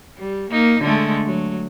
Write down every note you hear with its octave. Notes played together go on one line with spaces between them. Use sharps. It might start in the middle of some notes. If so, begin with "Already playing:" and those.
G3
A#3 D#4
D3 G#3 A3
F#3